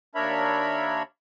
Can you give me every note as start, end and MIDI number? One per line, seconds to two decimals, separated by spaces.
0.15 1.03 39
0.15 1.03 62
0.15 1.03 70
0.15 1.03 73
0.15 1.03 76
0.15 1.03 83